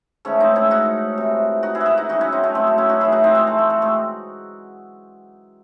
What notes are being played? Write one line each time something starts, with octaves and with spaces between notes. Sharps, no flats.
G#2 E3 A3 C#4
C4 D#4
C#4 E4
D#4 F#4
C3 E3
D#4 F#4
E4 G#4
F#4
E4 G#4
D#4 F#4
F#2 E3 D#4 F#4
C#4 E4
C4 D#4
A3 C#4
G#3 C4
A3
C#4 E4
D#4 F#4
A2 E3 E4 G#4
D#4 F#4
C4 D#4
G#3 C4
A3
G#3
A3
G#3 C4